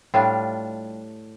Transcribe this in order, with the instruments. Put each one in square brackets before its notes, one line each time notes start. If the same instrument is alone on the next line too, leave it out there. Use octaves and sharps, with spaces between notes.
[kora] A2 G3 D4 F4